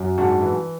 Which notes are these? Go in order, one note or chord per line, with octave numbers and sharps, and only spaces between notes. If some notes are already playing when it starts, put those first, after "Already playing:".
Already playing: F#2 F#3
G#2 D4 F#4
E3